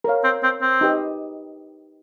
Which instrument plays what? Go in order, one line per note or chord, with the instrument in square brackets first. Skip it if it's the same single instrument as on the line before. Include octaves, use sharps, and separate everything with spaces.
[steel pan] A#4 C#5 F5
[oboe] C4
C4
C4
[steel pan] D#4 G4 B4 D#5